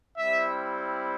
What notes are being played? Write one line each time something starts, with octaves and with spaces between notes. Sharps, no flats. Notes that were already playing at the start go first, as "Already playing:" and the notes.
G3 C4 E4 E5